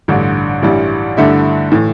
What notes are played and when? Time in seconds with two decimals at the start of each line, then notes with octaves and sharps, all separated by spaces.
0.08 A1 G2 D3
0.62 A1 G2 E3 G3
1.17 G2 D3 A3 E4
1.72 A2 E3